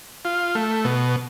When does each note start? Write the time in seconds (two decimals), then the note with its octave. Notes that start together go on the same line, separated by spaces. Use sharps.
0.25 F4
0.55 A3
0.84 B2